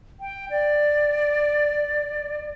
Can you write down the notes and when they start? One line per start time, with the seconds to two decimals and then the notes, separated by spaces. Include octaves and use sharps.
0.20 G5
0.50 D5